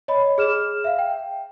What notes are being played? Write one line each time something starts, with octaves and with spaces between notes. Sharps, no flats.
C#5 D#5 B5
G#4 F6 E7
E5 F5
G5